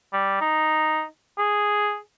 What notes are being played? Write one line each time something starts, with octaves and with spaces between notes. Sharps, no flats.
G3
D#4
G#4